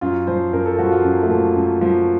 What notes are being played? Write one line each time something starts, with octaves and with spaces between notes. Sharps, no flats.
F#2 F4
F3 C5
F#2 A#4
A4
F3 F#4
F4
F#2
A3
F3 A#3
F#2
F3